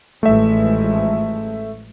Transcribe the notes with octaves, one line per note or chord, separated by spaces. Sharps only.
A1 F3 G#3 A3 E5